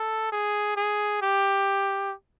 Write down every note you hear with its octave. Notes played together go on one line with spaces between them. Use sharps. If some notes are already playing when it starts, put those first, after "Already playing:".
Already playing: A4
G#4
G#4
G4